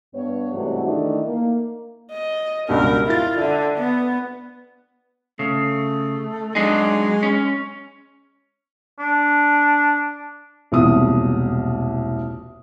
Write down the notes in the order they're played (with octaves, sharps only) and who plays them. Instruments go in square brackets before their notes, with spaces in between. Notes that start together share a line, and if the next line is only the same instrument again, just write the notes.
[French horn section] G2 B3 C#5
G#2 C3 E3 G3 A3 F#4
D#3 E3 A3 D4 D#4
A#3
[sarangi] D#5
[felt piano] C#2 G2 B2 [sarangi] A#4
[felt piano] E4 A6 [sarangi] F4
[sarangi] D3 [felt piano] E5
[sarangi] B3
[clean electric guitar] C#3 [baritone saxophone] A3
[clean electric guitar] F#3 D4 D#4 [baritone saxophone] G#3
[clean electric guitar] C#4
[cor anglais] D4
[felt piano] E1 C2 A#2 D#6